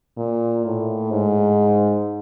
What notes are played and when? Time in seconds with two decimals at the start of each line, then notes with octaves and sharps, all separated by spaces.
0.17 A#2
0.64 A2
1.11 G#2